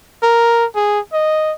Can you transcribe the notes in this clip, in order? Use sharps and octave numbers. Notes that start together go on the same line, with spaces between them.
A#4
G#4
D#5